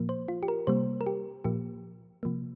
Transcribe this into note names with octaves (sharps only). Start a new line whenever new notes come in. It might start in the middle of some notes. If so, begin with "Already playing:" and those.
Already playing: A#2 F3 A#3
C5
F4
G4
A#4
C3 G3 A#3 C5
A#4
G4
A#2 F3 A#3 G4
C3 F3 A#3